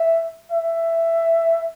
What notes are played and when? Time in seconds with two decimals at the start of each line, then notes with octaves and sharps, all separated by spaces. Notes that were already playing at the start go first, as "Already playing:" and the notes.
Already playing: E5
0.51 E5